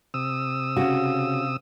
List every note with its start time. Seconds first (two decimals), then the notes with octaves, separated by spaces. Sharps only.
0.14 C3 D#6 E6
0.76 C#3 F#4